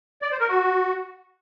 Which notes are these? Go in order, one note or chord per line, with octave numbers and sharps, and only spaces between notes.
D5
C5
A#4
F#4